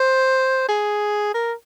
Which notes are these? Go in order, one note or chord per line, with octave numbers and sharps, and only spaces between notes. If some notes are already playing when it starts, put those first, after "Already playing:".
Already playing: C5
G#4
A#4